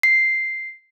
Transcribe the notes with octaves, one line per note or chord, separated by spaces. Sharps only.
C7